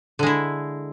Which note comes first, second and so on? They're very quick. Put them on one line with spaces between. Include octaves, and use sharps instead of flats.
D3 G#3 E4